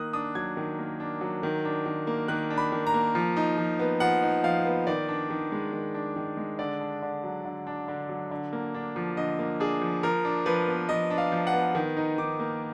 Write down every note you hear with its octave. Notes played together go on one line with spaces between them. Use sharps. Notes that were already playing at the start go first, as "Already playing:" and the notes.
Already playing: D#3 A#3 D#6 F#6
D4 D#6
F#3 G#6
D#3
A#3
D4
F#3
D#3
D4
D#3
A#3
D#3 F#6
D4
B5
D#3
A#5
A#3
F3
D#4
F3
B3
F3 F#5
D#4
F3 F5
B3
D#3 D5
D4
D#3
G#3
D#3
D4
D#3
G#3
D3 D5
D4
D3
F#3
D3
D4
D3
F#3
D3
A#3
D4
F3
D3 D#5
A#3
D4 G#4
F3
F3 A#4
D4
F3 B4
B3
F3 D#5
D4
F5
F3
F#5
B3
D#3
D#4
D#3 D6
A#3